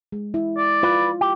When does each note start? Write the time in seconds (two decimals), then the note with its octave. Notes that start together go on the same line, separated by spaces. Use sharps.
0.12 G#3
0.34 E4
0.57 D5
0.83 F4 B4
1.21 G4